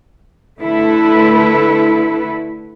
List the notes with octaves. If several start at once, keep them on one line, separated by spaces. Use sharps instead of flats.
D3 A3 E4 A4 B4